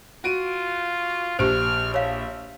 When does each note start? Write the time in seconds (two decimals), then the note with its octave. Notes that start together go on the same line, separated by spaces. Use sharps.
0.24 F4 F#4 D7 D#7
1.39 A#1 G4 C5 F6 D7
1.94 C#5 E5 F5